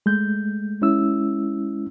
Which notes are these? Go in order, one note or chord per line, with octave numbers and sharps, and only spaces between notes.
G#3 A3 G6
G#3 C#4 E4 E6